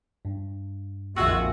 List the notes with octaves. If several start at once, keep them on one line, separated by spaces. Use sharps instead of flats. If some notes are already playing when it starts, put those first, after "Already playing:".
G2
A#1 F2 D#3 G#3 F4 F#4 E5 E6